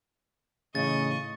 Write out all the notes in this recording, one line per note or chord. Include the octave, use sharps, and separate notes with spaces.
A2 C#3 E3 D#4 D#5 C#6 A6